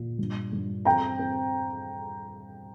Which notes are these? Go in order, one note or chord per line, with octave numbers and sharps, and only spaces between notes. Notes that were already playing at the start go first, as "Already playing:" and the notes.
Already playing: A#2
G2
G2
C4 G5 A#5
C4